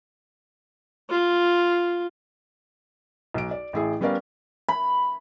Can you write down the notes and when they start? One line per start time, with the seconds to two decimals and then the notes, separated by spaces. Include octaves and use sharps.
1.10 F4
3.34 B1 D7
3.51 D5
3.73 A1 E4 G#4
4.01 G3 B3 C#4 A#4 D5 F5
4.69 B5